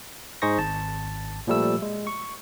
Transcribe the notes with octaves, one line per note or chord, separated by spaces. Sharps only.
G#2 D#4 G#4 C5 C#6 A#6
G#1 A5
A#2 F3 G3 A3 E6
G#3
C#6